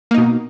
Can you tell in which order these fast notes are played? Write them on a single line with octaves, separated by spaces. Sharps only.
A#3 D#4 B2